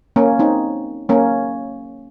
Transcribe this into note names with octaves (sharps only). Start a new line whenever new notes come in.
A#3 C#4
C4 D#4
A#3 C#4